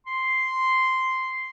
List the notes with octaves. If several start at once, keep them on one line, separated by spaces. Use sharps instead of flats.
C6